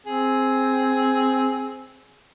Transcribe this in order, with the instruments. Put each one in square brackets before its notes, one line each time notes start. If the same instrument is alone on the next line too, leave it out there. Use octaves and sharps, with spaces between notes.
[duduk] C4 [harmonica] G#4